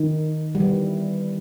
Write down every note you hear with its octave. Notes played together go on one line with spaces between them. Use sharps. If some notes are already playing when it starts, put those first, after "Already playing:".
Already playing: D#3
G3
E3